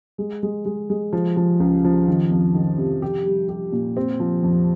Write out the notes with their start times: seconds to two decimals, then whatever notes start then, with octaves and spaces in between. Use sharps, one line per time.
0.18 G#3
0.43 G#3
0.65 G#3
0.90 G#3
1.13 F3
1.37 F3
1.60 C#2
1.84 F3
2.08 D#3
2.31 F2
2.55 D#3
2.78 C3
3.02 G4
3.25 G3
3.49 G4
3.72 A#2
3.97 C4
4.20 F3
4.43 F2